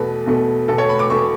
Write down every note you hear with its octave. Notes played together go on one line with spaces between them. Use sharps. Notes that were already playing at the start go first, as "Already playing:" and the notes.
Already playing: E2 B2 A3 B4
E2 B2 A3
E2 B2 A3 A4
C#5
B5
D6
E2 B2 A3 C#6